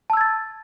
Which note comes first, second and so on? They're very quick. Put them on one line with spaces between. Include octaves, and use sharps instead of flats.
A5 E6 G#6 A6